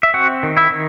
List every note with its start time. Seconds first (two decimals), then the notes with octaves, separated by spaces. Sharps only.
0.03 E5
0.14 C4 F#4 F#5
0.43 D#3
0.57 E4 E5
0.71 D#3